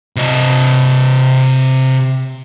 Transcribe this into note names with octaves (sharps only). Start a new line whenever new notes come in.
C3 D#5